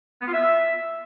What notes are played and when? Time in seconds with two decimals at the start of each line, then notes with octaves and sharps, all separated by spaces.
0.22 B3
0.27 F4
0.33 E5